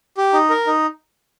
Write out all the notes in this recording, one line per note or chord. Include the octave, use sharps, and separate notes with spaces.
G4
D#4
A#4
D#4